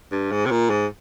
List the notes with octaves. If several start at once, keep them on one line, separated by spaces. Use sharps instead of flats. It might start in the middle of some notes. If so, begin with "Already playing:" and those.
G2
G#2
C3
A#2
G#2